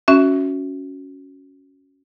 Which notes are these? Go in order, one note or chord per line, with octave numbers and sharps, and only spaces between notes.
C#4 F#4 E5